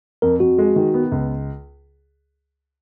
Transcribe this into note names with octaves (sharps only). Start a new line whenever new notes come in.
F2 A#4
F2 F#4
G#3
D#3
B3
C#2